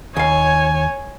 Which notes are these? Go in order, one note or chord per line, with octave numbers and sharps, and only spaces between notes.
D#2 C#5 F5 G#5